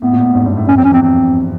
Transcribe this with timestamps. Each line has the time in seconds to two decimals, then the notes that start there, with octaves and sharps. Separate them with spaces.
0.01 A2 B3
0.13 A#2
0.24 A2
0.35 G#2
0.46 G2
0.57 A2
0.67 G2 C#4
0.77 F2 C4
0.84 C#4
0.90 E2 C4
1.02 C4